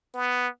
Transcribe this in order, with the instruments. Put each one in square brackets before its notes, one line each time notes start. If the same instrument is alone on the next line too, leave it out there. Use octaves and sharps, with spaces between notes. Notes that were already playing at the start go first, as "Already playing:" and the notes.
[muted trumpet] B3